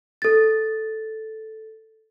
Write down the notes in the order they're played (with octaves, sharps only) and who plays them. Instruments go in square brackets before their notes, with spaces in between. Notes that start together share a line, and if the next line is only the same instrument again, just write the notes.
[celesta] A4 A6